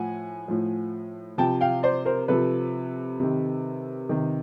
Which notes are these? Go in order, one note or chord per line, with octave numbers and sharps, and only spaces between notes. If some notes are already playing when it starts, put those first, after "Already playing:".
Already playing: A2 F3 F#5 G#5
A2 F3
C3 F3 G5 A5
F5 G5
C5 D5
A#4 C5
C3 F3 A4 B4
C3 D#3
C3 D#3